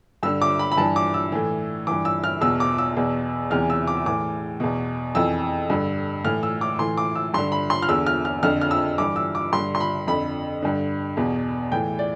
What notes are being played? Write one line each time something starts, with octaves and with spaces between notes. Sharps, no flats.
G2 D3 E6
D6
B5
B5
G2 E3 A5
D6
E6
A2 E3
G2 E3 D6
E6
F6
E2 B2 E6
D6
E6
E2 B2
E2 C3 E3 F6
E6
D6
A2 E3 D6
E2 B2
F2 E3 E6
G2 D3
A2 E3 F6
E6
D6
A2 E3 C6
D6
E6
G2 D3 C6
B5
C6
F6
E2 D3 E6
F6
F6
F2 D3 F6
F6
E6
G2 E3 D6
E6
D6
G2 D3 C6
C6
B5
F2 D3 B5
G2 D3
E2 B2
A2 E3 G5
D5